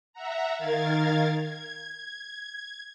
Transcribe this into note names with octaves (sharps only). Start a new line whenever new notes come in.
E5 F#5 A#5
D#3 A#4 F5 G#6 A6
G#6